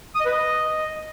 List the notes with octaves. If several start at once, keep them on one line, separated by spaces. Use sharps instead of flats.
D#6
D#5
B4
D#5